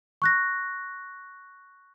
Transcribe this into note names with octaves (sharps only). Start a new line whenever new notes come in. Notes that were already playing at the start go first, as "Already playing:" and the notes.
C#6 F#6 A#6